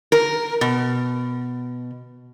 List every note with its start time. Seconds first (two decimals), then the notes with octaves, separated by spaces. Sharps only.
0.12 A#4
0.61 B2